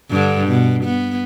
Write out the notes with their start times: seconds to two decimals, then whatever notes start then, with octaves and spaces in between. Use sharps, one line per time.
0.10 G2 D3
0.48 B2
0.84 B3